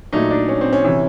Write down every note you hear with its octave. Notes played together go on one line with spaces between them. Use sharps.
A#2 F#3 A3 D#4
D4
C#4
C4
C#4
C3 E3